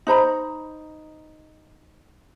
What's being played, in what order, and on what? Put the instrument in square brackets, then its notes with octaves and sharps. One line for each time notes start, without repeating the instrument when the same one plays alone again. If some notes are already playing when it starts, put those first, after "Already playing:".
[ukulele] D#4 C5 A#5 B5